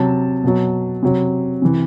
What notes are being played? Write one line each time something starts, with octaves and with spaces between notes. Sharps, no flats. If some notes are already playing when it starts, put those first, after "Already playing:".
Already playing: C3 F#3 A5
B2 F#3
C3 F#3
C3 E3